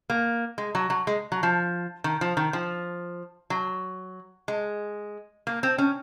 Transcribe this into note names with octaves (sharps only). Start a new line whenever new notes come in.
A#3
G#3
F#3
F#3
G#3
F#3
F3
D#3
F3
D#3
F3
F#3
G#3
A#3
C4
C#4